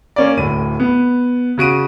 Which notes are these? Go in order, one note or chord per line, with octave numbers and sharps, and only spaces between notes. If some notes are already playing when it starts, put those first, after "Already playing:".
A#3 C#4 D5
D1 A2 D#7
B3
C#3 F#4 D7 D#7